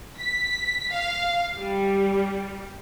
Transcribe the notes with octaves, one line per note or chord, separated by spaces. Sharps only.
B6
F5
G3